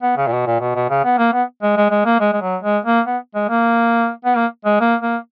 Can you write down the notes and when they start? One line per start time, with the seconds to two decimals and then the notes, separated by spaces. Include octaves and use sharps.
0.02 B3
0.17 C#3
0.27 A#2
0.32 B2
0.46 A#2
0.60 B2
0.75 B2
0.90 C#3
1.04 B3
1.18 A#3
1.33 B3
1.63 G#3
1.77 G#3
1.91 G#3
2.05 A#3
2.20 G#3
2.33 G#3
2.41 F#3
2.63 G#3
2.85 A#3
3.07 B3
3.35 G#3
3.49 A#3
4.25 B3
4.36 A#3
4.65 G#3
4.80 A#3
5.01 A#3